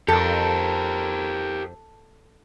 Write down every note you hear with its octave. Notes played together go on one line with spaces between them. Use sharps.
F2 G4 A4 A#4